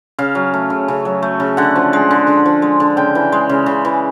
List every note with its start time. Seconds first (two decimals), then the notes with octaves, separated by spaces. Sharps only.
0.19 C#3 F5
0.35 F#3
0.54 A3
0.70 C#3
0.88 C#3
1.05 F#3
1.22 A3
1.40 C#3
1.57 D3 F#5
1.76 F3
1.93 G#3
2.11 D3
2.27 D3
2.45 F3
2.62 G#3
2.80 D3
2.97 C#3 G5
3.15 E3
3.32 G#3
3.49 C#3
3.66 C#3
3.85 E3